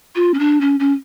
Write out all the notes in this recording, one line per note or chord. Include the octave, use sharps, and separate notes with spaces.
F4
C#4
D4
C#4
C#4